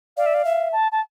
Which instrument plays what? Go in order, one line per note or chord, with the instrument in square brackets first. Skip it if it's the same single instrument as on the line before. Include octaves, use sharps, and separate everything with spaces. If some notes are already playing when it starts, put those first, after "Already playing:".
[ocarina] D5 [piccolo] F5
[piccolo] E5
F5
[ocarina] E5
[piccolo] A5
A5